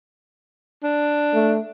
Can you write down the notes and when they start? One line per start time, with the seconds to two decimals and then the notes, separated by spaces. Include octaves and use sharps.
0.83 D4
1.34 A3